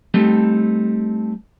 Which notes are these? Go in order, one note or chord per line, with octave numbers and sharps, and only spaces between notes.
G3 A3 C4 D#4 G4 A4